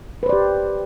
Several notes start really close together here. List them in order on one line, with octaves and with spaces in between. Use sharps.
B4 C5 D5 G4